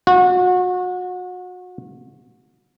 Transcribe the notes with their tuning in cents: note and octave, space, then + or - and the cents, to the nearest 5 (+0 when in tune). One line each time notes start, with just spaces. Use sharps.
F#4 -30